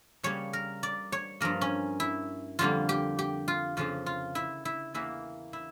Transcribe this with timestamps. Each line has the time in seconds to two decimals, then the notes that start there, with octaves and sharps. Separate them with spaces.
0.23 C#3 G3 A#3 C#5
0.53 A#4
0.83 D5
1.12 C#5
1.40 G2 F3 A#3 A#4
1.61 C#4
2.00 E4
2.59 F2 D3 G3 A#3 F4
2.89 G4
3.19 G4
3.48 F4
3.77 F2 C#3 F3 A#3 F4
4.06 F4
4.35 E4
4.65 E4
4.94 E2 E3 A#3 E4
5.53 E4